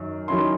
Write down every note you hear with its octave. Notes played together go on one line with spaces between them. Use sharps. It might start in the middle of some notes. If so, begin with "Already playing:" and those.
Already playing: F#2 D#3
D#3 F#3 C#4 E4 C6